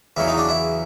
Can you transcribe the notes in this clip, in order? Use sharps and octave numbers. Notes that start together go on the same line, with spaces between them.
E2 C#3 F#3 E4
D#4
D4
E4